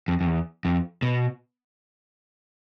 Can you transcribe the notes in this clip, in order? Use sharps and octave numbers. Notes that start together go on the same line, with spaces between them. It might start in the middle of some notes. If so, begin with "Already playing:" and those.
F2
F2
E2
F2
B2